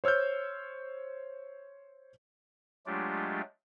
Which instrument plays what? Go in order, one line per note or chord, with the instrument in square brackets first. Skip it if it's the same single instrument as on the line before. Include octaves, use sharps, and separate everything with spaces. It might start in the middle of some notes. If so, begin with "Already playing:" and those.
[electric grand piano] C5 C#5 E6 F6 G6
[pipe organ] F#3 G#3 A3 D4 F4 G4